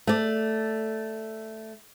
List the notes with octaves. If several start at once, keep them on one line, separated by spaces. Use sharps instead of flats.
A3 D5